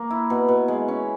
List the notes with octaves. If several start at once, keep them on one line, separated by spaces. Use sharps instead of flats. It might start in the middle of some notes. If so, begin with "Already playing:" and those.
Already playing: A#3
E4
B2
B2
G#3
C#4